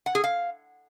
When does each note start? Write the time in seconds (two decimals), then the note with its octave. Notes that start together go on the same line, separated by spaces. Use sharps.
0.06 F#5
0.15 G#4
0.24 F5